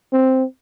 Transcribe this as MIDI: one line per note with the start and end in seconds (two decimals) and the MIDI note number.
0.13 0.44 60